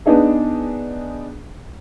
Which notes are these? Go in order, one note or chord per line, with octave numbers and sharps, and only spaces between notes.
B3 D4 D#4 G#4